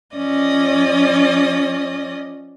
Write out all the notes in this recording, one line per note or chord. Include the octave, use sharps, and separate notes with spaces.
F3 C#4 D5 D#5 D#6